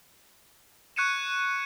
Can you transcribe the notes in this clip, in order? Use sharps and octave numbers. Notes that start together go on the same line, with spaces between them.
C#6 F#6 G#6 C#7 D#7 E7